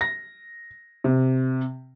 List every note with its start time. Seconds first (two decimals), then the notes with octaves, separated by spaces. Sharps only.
0.01 A#6
1.04 C3